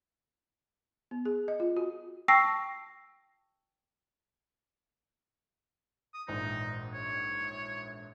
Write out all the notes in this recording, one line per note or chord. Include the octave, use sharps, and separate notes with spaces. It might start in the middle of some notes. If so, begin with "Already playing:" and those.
B3
G#4
D#5
F4
F#4
G5 A5 C#6 E6 A#6 C7
D#6
A#1 G#2 E3 D#4
C#5